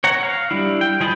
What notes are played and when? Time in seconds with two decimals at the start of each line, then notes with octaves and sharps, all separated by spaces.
0.04 C#5 F#5 A#5
0.23 F5
0.51 G3 D4 E4
0.81 G5
1.00 F3 G#4 D#5 A5 B5